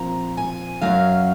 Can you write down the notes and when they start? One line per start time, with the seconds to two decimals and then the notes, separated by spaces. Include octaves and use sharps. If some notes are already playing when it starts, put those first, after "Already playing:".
Already playing: A#2 F3 C4 A#5
0.37 G#5
0.81 F#2 C#3 F#3 C#4 F5